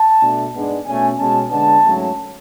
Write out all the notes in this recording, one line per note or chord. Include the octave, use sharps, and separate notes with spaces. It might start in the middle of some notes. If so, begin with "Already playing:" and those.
Already playing: A5
B2 A3 D4
G#2 G#3 B3 D4
B2 A3 C#4 G#5
B2 G#3 C#4 A5
D3 G#3 B3 D4 A5
G#2 F#3 A3 C#4